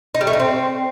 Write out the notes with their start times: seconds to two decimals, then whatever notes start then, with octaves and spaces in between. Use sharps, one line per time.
0.15 D#4
0.21 G3
0.27 A3
0.33 D#4
0.40 C4